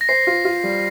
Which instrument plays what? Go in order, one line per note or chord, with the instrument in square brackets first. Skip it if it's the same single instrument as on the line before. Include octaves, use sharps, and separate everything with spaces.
[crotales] A#6
[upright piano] C5 [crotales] C7
[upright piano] F4
F4
G3